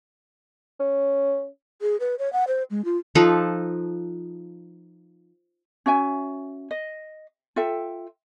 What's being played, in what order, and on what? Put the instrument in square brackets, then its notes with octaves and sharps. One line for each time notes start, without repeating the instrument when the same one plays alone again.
[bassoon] C#4
[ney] G#4
B4
C#5
F#5
C5
G#3
F4
[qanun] F3 D#4 A4 B4
[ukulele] C#4 F#4 E5 G#5
D#5
F4 A4 E5 G5